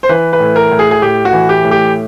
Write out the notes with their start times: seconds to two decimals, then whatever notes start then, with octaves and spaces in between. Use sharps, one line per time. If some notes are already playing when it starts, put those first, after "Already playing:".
0.03 C5
0.09 E3 B4
0.33 B4
0.40 A2
0.56 A#4
0.71 A2
0.79 G#4
0.91 G#4
1.02 A2 G4
1.25 F#4
1.33 E3
1.49 G4
1.64 A2
1.71 G4